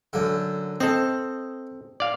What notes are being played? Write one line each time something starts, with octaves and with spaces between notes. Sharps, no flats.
F#2 D3
C4 A4 D#5
D5 F5